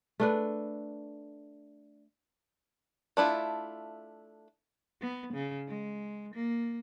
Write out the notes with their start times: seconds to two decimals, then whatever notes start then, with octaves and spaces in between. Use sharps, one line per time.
0.20 A3 D4 B4
3.17 A3 D4 E4 F4
5.01 B3
5.34 C#3
5.68 G#3
6.34 A#3